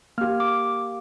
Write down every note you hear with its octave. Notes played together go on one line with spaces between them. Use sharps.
A#3 G4 F6
D6